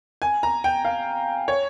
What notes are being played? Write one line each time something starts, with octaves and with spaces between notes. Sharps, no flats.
G#5
A#5
G5
F5
C#5